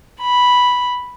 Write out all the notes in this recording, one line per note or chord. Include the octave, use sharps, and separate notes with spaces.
B5